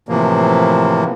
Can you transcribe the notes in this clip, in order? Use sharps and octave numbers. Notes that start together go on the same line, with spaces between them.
A2 C3 E3 F3 A#3